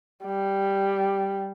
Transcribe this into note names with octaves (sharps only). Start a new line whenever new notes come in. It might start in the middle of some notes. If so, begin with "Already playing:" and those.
G3